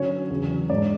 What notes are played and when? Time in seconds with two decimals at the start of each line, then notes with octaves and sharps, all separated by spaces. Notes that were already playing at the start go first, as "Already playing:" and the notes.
Already playing: D3 F#3 C#4 C#5
0.30 E2 C#3 F#3
0.70 G#2 G#3 D4 D5